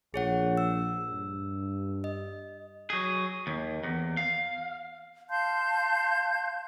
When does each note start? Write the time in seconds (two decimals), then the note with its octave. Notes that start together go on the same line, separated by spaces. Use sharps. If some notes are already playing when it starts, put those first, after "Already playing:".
0.14 A#1 G#4 C#5 F#5
0.57 E6
1.11 G2
2.04 D#5
2.90 F#3 G#4
3.47 D#2
3.83 E2
4.17 F5
5.29 F5 A5 C6 G6